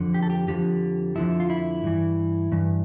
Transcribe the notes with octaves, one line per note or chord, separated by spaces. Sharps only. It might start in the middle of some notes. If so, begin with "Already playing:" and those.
Already playing: F2 D3 F3
G4
A4
G4
F2 D3 F3 G4
F2 D3 F3 E4
F4
E4
G2 E3
G2 E3